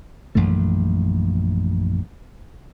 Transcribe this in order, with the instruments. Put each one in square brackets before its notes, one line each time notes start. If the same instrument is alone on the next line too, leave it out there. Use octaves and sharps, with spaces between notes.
[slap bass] A#1 F#2 E3 A3